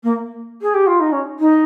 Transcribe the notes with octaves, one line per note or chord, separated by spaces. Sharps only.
A#3
G#4
G4
F4
D#4
C#4
D#4